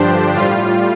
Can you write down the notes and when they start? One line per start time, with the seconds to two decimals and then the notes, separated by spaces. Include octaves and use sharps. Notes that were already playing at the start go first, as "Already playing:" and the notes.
Already playing: G2 D3 F3 D4 G4 C5
0.34 A2 G3 F4